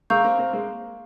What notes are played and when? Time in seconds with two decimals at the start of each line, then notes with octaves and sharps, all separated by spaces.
0.10 G#3 A#3 F5 A#5 C#6 E6 G6
0.24 A#3 C4
0.39 A#3 C4
0.53 G#3 A#3